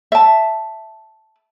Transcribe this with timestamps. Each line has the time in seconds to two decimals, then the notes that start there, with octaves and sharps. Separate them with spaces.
0.12 E5 A5